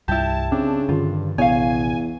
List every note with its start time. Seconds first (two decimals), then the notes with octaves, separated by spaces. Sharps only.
0.08 C2 G2 G3 E4 G4 A5
0.52 C#3 C4 D4
0.89 G2 D3 D#3 F4
1.38 A#1 E2 C3 B3 C#5 F5 G#5